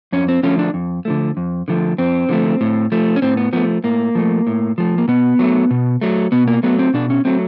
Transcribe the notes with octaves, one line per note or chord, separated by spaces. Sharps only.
F2 C#4
C4
D3 F3 A3 C#4
D4
F2
D3 F3 A3
F2
D3 F3 A3
F2 C4
D3 F3 A3
A2
F3 A3
C#4
A2 C4
B3
F3 A3 B3
A2 A#3
F3 A3
A2
F3 A3
A#3
B2 B3
F#3 A3
B2
F#3 A3
B2 B3
A#3
F#3 A3 B3
C4
B2 D4
C#4
F#3 A3 C4